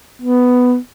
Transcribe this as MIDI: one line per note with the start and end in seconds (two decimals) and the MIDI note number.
0.22 0.77 59